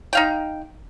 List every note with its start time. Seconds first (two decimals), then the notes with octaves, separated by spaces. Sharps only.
0.13 D#4 F5 G5